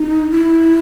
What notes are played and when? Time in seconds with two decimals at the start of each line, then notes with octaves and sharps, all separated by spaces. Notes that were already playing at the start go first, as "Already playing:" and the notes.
Already playing: D#4
0.31 E4